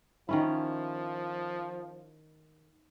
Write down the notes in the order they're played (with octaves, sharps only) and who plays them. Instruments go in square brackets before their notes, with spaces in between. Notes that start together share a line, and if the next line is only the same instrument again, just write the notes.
[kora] D#3 C#4 E4 [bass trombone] F3